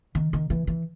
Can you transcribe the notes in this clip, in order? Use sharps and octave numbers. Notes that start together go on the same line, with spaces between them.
D#3
D#3
E3
E3